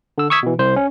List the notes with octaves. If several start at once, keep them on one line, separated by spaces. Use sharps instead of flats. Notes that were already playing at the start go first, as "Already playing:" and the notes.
D3 E6
C#6 D#6 E6 G#6 B6
B2 E3
C2 C5
C#4